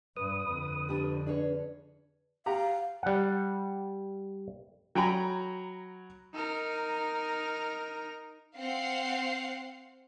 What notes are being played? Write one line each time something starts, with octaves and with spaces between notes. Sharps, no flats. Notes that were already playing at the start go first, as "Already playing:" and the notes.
G2 B4 D#6
F2 D3
D4 G4
D4 G#4 B4 C#5
G4 F5 F#5 A#5
G3 F#5
F#3 G5 G#5 A#5 B5
D#4 A#4
C4 F5 F#5 C7